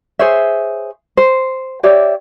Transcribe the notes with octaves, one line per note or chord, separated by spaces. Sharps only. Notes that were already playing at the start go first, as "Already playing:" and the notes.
G#4 C5 C#5 E5
C5
G4 C#5 D5 E5